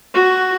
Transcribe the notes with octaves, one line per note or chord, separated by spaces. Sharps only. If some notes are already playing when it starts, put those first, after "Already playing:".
F#4